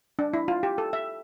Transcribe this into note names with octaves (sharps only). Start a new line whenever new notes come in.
D4
E4
F4
G4
A4
E5